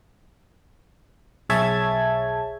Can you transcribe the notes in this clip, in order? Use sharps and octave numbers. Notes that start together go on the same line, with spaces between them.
B1 G#4 C#5 E5 A5 G#6